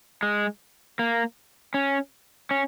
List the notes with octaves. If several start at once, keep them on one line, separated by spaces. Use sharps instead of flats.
G#3
A#3
C#4
C#4